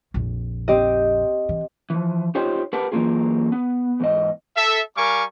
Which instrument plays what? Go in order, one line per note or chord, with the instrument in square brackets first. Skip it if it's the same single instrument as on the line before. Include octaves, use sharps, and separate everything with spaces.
[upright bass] A#1 F2
[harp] C4 G4 D#5
[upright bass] E3
[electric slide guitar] E3 F3
D#4 F4 G4 C5 C#5
G4 A#4 B4 F#5 A5
E3 F#3 G#3 A#3 F4 G#4
B3
E2 G#2 D#5
[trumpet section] A4 E5
G3 A#4 F5 G#5 C#6 D6